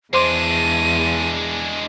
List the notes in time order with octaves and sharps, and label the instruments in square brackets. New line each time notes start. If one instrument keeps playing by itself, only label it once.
[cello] E2 [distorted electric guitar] G#3 D4 [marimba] C5 C6 D6 [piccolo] D#7